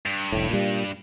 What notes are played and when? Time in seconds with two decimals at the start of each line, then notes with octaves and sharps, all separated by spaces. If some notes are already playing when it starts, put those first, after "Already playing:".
0.06 G2
0.32 F1 A2
0.50 A#2 G3